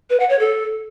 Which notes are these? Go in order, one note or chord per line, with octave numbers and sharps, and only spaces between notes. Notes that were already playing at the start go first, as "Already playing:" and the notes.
B4
F#5
C#5
A4